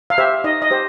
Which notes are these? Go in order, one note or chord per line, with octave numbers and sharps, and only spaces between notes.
F5
G4 C5 E5
D#4 D#5
D#5
G4 C5